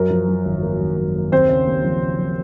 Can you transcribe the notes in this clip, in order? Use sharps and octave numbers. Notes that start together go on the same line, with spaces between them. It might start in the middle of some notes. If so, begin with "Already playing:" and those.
Already playing: F#2 A#4
F3
F3
G#1
A#3
G#1
F#2
A#3
D#2 C4 C5
C#3
D#2
F3
C#3
F3